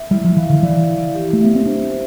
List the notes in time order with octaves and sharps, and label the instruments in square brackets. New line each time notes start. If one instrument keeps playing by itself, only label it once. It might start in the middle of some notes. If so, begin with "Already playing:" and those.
Already playing: [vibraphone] E5
[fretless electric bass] G3 [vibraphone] E4
[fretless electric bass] F3
[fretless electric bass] E3 [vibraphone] F5
[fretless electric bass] D3
[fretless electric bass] E3 [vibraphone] D5
[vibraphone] E4
G4
[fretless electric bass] A3
[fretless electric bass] B3 [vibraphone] E5
[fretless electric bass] C4
[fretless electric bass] D4 [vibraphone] C5
[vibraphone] C5